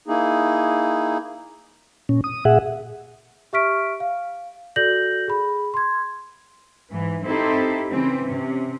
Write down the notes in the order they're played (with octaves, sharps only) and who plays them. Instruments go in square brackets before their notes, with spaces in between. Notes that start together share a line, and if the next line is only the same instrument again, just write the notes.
[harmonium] A#3 D#4 E4 G#4
[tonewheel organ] A#2 C#4
D#6
A#2 G#4 E5 F#5
[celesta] G4 E5 C#6 F6 B6 D7
F5
F#4 A4 D5 G6 A#6 F#7
G#4 B5
C6 G#6
[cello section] G#2 E3
C4 D#4 E4 G4 A4 C5
C#3 E3 C4
C3 C#4